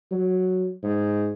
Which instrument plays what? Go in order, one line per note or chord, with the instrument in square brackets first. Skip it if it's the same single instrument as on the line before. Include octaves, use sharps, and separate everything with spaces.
[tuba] F#3
G#2